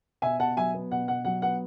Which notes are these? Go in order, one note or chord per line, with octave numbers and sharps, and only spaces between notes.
B2 E5 G#5
B2 F#5 A5
F#3 E5 G#5
B3
B2 F#5
B2 F#5
F#3 F#5
B3 F#5